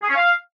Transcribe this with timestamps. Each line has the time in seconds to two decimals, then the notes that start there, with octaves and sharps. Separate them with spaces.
0.02 G#4
0.09 C#4
0.15 F5